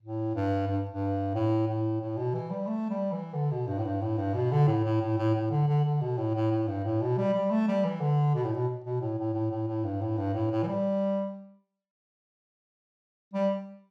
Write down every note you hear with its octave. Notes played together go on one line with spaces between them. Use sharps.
A2
G2
G2
G2
A2
A2
A2
B2
E3
G3
A3
G3
E3
D3
B2
G2
A2
G2
A2
G2
B2
D3
A2
A2
A2
A2
A2
D3
D3
D3
B2
A2
A2
A2
G2
A2
B2
G3
G3
A3
G3
E3
D3
B2
A2
B2
B2
A2
A2
A2
A2
A2
G2
A2
G2
A2
A2
E3
G3
G3